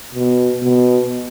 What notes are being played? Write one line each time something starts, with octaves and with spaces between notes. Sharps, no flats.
B2
B2